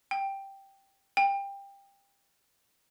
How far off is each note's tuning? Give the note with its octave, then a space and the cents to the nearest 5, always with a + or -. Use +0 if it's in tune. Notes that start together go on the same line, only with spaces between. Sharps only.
G5 +0
G5 +20